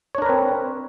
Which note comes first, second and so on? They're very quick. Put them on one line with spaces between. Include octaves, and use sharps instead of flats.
C#5 D4 A#4 B4 C4